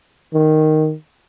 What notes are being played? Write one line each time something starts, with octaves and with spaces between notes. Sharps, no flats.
D#3